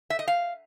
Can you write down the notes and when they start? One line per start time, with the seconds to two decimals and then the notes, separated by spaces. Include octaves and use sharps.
0.10 E5
0.19 D#5
0.28 F5